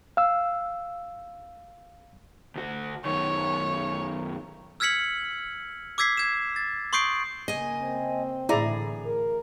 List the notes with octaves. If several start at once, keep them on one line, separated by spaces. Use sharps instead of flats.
F5 E6
D2 F#4
F#2 D#3 C#5
E6 F6 G#6 B6 C#7 F#7
D6 E6 G#6 B6 C7
G#6 E7
A6
C6 C#6 D#6 G6 C7 D7
C#3 A#3 D#5 G#5
C4
A2 D3 E3 E4 G#4 D5 A#5
A#4